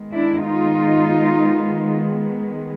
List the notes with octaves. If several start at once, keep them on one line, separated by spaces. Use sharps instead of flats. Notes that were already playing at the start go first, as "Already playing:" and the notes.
Already playing: D#3 G#3 B3
D4 E4
D#4 F4